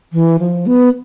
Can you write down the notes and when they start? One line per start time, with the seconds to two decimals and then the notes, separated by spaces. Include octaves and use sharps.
0.13 E3
0.39 F3
0.67 B3